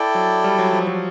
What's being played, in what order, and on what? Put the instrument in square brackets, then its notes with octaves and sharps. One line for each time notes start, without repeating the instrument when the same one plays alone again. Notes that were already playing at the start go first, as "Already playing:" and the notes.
Already playing: [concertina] E4 A4 D5 G5
[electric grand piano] F#3
G3
F#3
F3
F#3